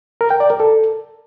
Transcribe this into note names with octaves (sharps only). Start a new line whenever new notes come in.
A#4
G5
D5
A#4
A4